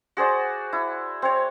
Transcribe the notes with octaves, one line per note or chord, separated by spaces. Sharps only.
F#4 G#4 C5 D5
E4
C4 C#5